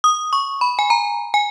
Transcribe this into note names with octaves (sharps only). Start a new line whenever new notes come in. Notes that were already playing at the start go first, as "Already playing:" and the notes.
D#6
C#6
B5
G#5
A#5
G#5